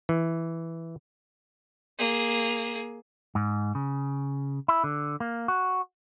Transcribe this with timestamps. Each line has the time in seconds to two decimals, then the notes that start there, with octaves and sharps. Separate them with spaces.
0.09 E3
1.99 A#3 G#4
3.35 G#2
3.75 C#3
4.68 E4
4.84 D3
5.20 A#3
5.48 F#4